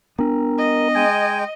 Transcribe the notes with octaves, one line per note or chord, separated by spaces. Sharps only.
B3 D4 A#4
D#5
G#3 G5 G#5